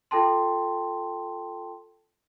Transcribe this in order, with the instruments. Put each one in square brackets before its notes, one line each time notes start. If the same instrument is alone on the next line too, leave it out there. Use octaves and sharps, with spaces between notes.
[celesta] F4 A4 G5 A5 C6